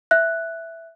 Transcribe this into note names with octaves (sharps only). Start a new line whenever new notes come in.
E5 F#6